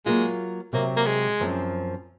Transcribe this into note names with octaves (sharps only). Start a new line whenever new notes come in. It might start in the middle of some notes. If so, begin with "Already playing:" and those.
F#3 G#3 A#3 F4
C3 F#3 A#3 C4
A#3
G#3
F#2 F3 C4